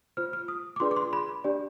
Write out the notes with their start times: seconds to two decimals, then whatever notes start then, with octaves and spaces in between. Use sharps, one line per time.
0.17 F4 C5 F6
0.33 F6
0.48 D#6
0.76 D6
0.80 D4 F4 G#4 B4 D5 C6
0.91 D6
0.96 C6
1.13 B5
1.44 D4 G4 D5